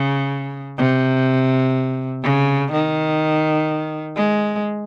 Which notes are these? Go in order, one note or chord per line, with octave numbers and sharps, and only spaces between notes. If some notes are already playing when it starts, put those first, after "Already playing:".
Already playing: C#3
C3
C#3
D#3
G#3